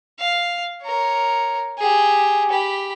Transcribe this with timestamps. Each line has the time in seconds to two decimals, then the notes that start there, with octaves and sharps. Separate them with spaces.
0.19 F5
0.83 A#4 C#5
1.78 G4 G#4
2.50 G4 B5